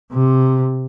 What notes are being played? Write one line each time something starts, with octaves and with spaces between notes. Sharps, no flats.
C3